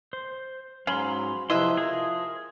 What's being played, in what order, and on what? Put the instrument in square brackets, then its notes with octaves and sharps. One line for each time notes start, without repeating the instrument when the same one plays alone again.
[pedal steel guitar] C5
[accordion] G#2 F#3 [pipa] C#4 [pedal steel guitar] F5 B5 C6
[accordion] C3 F3 [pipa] E4 D#5 E5 [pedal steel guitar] B4 C6
[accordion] F3 [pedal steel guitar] G#4 A#4